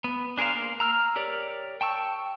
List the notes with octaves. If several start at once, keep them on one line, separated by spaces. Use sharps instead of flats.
B3
D4 G#4 A#4 C5 F5
A#3
A#5 E6 F6
G4 A#4 C#5 D5
G5 A5 C#6 E6